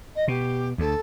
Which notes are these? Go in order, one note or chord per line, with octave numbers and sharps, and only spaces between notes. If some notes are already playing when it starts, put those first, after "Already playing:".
D#5
B2 G4
D2 A4